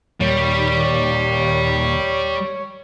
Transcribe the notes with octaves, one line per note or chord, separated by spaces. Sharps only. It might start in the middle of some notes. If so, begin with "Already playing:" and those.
D#2 A#2 D#3 G3 C#5